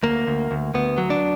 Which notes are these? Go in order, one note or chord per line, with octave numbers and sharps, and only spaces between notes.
D2 A#3
D2
D2
D2 B3
F#3
D4